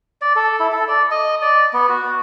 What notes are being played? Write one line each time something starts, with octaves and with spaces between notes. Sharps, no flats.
D5
A4
E4
A4
D5
D#5
D5
B3
F#4